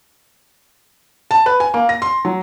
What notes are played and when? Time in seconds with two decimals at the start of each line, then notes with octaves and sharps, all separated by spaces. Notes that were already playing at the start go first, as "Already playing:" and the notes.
1.31 A5
1.46 B4
1.60 G#5
1.74 A#3
1.89 A#6
2.02 C6
2.25 F#3